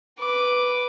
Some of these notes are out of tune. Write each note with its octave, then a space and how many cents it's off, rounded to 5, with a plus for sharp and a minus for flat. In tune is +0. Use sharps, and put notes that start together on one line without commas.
B4 +0 D6 +0